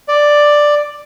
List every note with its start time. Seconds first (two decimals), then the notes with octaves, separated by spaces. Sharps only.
0.08 D5